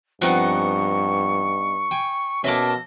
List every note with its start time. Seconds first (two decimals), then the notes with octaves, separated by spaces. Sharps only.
0.22 G2 F3 B3 C4 D#4 F#5 C#6
1.91 G5 G#5
2.44 B2 A#3 C#4 A4 E5 D6 A#6